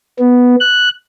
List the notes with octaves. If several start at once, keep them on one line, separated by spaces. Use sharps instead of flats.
B3
F#6